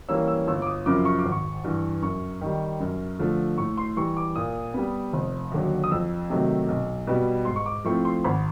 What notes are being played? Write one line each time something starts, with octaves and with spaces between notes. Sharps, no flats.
E3 G3 A#3 C#4 E6
E6
G1 E6
D6
D#6
F#2 C#3 F3 D6
C#6
D6
G#1
C#6
G2 E3
F#2 C#6
D#3 G3
F#2
D3 F3 A3
A2 C#6
C6
E3 G3 C#6
D6
A#2 D#6
G3 B3
F1
D#2 D3 F#3
D#6
F2 E6
C3 D#3 F#3 A3
B1
B2 G3 B3
G#2 C6
C#6
D6
F3 A3 C4 E4 C#6
C6
G#1 B5